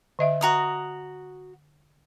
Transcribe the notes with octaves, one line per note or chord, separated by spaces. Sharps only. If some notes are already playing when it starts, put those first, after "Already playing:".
D3 D#5 E5
F#4 A#5 D#6